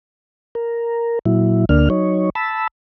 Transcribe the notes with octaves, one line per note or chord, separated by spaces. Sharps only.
A#4
A#2 F#3 E4
D2 D3 A#3 D4 F6
F#3 D#4 C#5
A5 B5 E6